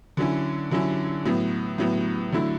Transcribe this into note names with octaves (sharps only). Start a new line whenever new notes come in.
D3 F#3 C#4 E4
D3 F#3 C#4 E4
A2 F#3 B3
A2 F#3 B3
D3 F#3 A3 E4